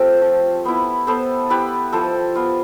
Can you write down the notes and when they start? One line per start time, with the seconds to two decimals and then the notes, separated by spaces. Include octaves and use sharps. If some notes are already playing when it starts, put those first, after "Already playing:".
Already playing: A3 C4 F4 G4 A4 C5
0.22 F3
0.65 B3 E4
1.07 B3 A4 C5
1.50 E4 G4 B4
1.92 F3 A4 C5
2.35 B3 F4